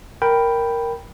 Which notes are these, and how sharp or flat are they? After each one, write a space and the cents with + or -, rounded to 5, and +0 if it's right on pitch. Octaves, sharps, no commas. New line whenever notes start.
A#4 +0 G5 +0 B5 +0